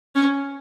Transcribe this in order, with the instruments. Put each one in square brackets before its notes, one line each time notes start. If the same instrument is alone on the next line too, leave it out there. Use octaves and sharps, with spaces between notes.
[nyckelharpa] C#4